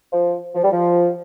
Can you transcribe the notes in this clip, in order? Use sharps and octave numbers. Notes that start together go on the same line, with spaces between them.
F3
F3
G3
F3